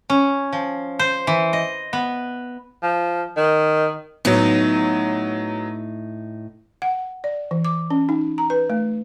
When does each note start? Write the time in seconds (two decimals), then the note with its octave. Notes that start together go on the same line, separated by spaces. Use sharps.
0.10 C#4
0.53 F3
0.99 C5
1.27 E3
1.53 D#5
1.93 B3
2.83 F3
3.37 D#3
4.25 A2 F#3 B3 D#4
6.82 F#5
7.24 D5
7.51 E3
7.65 D6
7.90 C#4
8.09 D#4
8.38 A#5
8.50 B4
8.70 A3